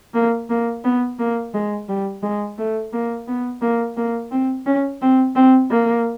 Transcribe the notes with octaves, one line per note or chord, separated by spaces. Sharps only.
A#3
A#3
B3
A#3
G#3
G3
G#3
A3
A#3
B3
A#3
A#3
C4
C#4
C4
C4
A#3